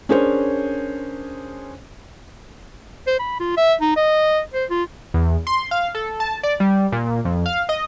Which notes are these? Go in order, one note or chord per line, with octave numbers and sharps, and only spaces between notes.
C#4 D4 G#4 A#4 C5 C#5
C5
B5
F4
E5
D#4
D#5
C5
F4
E2
C6
F5
A4
A5
D5
G3
A#2
F2
F5
D#5